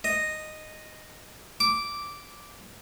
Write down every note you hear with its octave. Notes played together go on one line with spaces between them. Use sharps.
D#5
D6